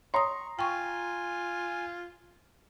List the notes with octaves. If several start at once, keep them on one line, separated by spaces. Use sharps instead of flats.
C#5 A#5 C6 C#6 D#6
F4 G5 G#5 C#6